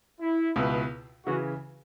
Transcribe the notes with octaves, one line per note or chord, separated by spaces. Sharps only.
E4
C#2 B2 B3 E4
C#3 E3 C#4 F#4